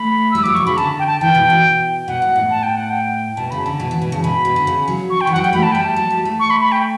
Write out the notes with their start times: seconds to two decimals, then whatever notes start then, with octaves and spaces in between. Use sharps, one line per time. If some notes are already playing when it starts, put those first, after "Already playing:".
Already playing: A3 B5
0.31 G3 E6
0.43 F#3 D6
0.55 B2 C#6
0.66 C#3 B5
0.77 D3 A5
0.99 G5
1.07 A5
1.21 E3 G5
1.35 B2
1.50 B2
2.08 B2 F#5
2.22 A2
2.36 A2
2.50 A5
2.63 G5
2.77 F#5
2.90 G5
3.36 B2 A5
3.50 C#3 B5
3.63 D3 A5
3.80 B2
3.91 E3
4.02 B2
4.12 C#3 A5
4.23 B2 B5
4.45 B2
4.56 D3
4.67 C#3
4.88 F#3
5.10 C#6
5.21 G5
5.27 E3
5.32 F#5
5.36 F#3
5.43 G3 G5
5.53 A3 B5
5.63 A5
5.72 G3 G5
5.81 A5
5.96 F#3
6.10 G3
6.25 A3
6.40 C#6
6.50 B5
6.61 B5
6.72 G5